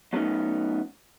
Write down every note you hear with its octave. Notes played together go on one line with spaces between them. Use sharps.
F#3 A3 B3 C#4 D#4